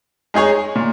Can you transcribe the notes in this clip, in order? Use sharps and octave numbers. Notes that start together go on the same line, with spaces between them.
G#3 D#4 G#4 C#5
A#2